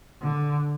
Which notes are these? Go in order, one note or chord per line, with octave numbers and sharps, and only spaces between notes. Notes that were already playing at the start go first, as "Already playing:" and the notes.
D3